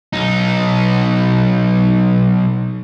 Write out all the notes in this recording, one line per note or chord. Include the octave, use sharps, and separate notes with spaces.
B1 D#4